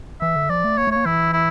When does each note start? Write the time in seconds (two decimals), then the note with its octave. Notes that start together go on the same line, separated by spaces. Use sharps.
0.21 E3 E5
0.36 D3
0.50 F3 D5
0.64 A3
0.78 A#3 C#5
0.87 A3
0.91 A#3 C#5
1.06 E3 E4
1.33 E4